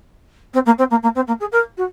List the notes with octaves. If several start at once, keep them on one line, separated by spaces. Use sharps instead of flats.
C4
A#3
C4
A#3
A#3
C4
A#3
G#4
A#4
F#4